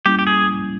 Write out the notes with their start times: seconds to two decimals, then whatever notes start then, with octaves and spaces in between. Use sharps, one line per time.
0.06 G3 A#3 C#4 E4 G4
0.19 G4
0.27 G#4